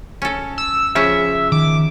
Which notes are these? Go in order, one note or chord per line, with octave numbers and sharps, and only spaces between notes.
C#4 A4
E6
C#3 F3 C#4 E5
D#3 D6